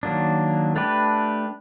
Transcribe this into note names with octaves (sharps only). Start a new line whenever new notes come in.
D#3 F#3 A#3 D4
A3 D4 G4 B4